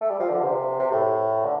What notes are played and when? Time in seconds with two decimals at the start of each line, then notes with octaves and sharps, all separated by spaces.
0.01 A3
0.10 G3
0.20 F3
0.29 D3
0.41 D3
0.44 C3
0.80 C3
0.92 A2
1.45 D3